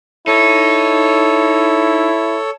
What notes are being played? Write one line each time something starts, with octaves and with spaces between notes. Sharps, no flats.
D#4 E4 A4 C#5